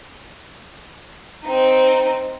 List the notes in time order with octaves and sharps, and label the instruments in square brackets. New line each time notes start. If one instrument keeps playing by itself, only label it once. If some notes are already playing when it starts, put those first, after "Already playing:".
[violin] C4 D#4